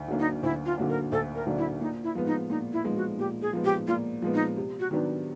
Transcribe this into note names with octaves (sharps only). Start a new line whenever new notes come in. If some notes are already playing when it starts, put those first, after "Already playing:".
Already playing: D2
D3 F#3 A#3 D4
D#4
D2 E4
F4
D3 F#3 A#3 D4
A#4
D2 A4
A#4
D3 F#3 A#3 D4
E4
A#2 D#4
E4
F3 G#3 B3
D#4
A#2 D#4
E4
F3 G#3 B3
F#4
A#2 G4
G#4
F3 G#3 B3
G4
A#2 F4
F3 G#3 B3
D#4
C3
F#4
D#3 F#3 B3 D4